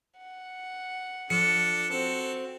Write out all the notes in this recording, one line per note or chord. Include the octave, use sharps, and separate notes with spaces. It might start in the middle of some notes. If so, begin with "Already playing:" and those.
F#5
F3 D4 A4 C#7
C4 F#4 A4